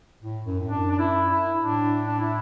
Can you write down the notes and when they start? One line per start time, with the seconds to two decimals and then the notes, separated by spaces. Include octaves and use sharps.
0.23 A2
0.45 F#2
0.59 A2
0.69 F#2 D4
0.91 D4
0.99 E4
1.31 E4
1.61 A2 D4
2.07 D4
2.20 E4